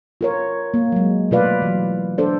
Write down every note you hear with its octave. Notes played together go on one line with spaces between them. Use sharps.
F4 A#4 C#5
A#3
F#3 G#3
B2 A3 F4 B4 D5 F5
E3 F#3
D4 A4 C5 D5